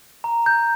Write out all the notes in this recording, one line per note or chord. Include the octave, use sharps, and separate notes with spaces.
A#5
G6